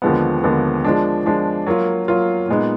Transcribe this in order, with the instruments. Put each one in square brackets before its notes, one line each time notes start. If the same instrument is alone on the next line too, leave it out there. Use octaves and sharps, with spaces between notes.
[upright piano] D#2 D3 F3 G#3 B3
D#2 D3 F3 G#3 B3
F3 G#3 D4
F3 G#3 D4
F#3 A#3 F4
F#3 A#3 F4
A#2 G#3 B3 D#4